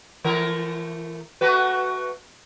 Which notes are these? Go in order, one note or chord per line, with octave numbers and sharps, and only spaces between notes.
E3 A3 A#4
A3 F#4 B4